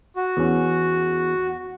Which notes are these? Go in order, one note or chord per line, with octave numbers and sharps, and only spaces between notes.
F#4
E2 C#4